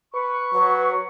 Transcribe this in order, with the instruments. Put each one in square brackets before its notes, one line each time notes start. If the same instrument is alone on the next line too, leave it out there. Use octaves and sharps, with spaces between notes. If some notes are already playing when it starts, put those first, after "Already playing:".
[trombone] B4 [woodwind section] C#6
[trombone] F#3 [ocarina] B4